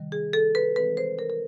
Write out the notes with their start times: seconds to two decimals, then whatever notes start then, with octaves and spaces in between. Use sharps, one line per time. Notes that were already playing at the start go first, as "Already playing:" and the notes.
Already playing: C3 D#3 G3
0.12 G#4
0.33 A4
0.55 B4
0.76 E3 G#3 C4 B4
0.97 C5
1.19 A#4
1.30 A#4